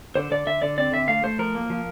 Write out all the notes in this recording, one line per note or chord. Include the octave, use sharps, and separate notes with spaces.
D3 C5
D3 D5
D3 E5
D3 D5
C4 D5
D3 E5
A3 F5
A3 C5
F3 A#4
A#3
F3